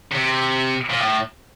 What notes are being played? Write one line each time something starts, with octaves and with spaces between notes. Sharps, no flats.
C3
A#2
A2